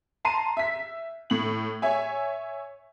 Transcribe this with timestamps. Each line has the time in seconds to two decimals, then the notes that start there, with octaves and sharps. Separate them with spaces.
0.25 A5 A#5 C6 C7 D#7
0.57 E5 B6
1.30 A2 F#7
1.82 C#5 E5 G#5